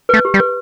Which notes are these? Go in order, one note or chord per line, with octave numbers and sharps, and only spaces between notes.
A3 B4
G4
G3
B4